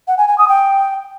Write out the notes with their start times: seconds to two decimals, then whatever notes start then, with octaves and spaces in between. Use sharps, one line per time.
0.08 F#5
0.18 G#5
0.28 G#5
0.38 D#6
0.48 G5